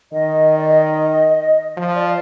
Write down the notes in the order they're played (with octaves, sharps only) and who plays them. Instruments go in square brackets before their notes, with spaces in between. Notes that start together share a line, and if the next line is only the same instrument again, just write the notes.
[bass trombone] D#3 [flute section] D#5
[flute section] D5
D#5
[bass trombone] F3
[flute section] D5